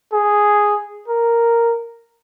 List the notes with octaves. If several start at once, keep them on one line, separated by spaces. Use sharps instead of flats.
G#4
A#4